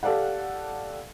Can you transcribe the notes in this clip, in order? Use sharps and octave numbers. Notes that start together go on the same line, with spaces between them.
G4 A4 D5 F5 F#5